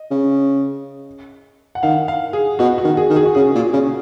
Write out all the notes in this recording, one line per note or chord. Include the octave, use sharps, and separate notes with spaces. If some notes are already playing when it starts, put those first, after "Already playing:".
Already playing: D#5
C#3
F#5
D#3 F5
F5
G#4
B2 F#4
F#4
D#3
G#4
D#3
G#4
F#4
C#3 G#4
A#2
C#3